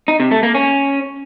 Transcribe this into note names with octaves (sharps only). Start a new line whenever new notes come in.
D#4
C3
A3
A#3
C#4